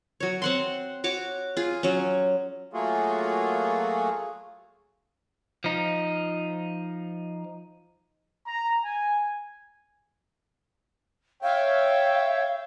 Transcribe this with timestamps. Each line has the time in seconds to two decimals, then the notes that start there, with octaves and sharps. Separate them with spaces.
0.20 F#3 C#5
0.42 C4 F#5 C6
1.04 F#4 C#5 D6
1.57 F4 G#4
1.83 F#3 C#4
2.73 F#3 A3 A#3 F4 F#4 G#4
5.64 F3 D#4
8.46 A#5
8.83 G#5
11.42 C#5 E5 F5 G5